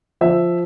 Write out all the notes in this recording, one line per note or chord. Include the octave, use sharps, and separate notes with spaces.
F3 E5